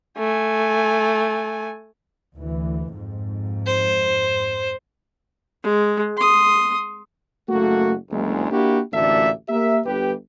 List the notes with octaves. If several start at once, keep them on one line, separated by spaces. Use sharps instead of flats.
A3 G#5
D2 E3
F2 G#2
C5
G#3
C6 D#6
F#1 A3 A#3 F#4
F#1 D2 G#3
A#3 D4 E4 F#4 G4
A1 D2 A#2 A4 D5 E5
A#3 G4 A#4 E5
G1 G4 B4